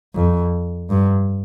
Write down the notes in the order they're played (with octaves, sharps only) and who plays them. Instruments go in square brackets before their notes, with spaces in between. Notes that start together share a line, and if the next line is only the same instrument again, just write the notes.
[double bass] F2
G2